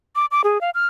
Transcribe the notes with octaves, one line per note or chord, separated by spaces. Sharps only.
D6
D6
G#4
F5
F6